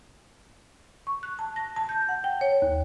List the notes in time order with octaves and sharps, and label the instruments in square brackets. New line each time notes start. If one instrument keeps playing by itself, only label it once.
[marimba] C#6
F#6
A5
A#6
A5
G6
F#5
G5
C#5
D#2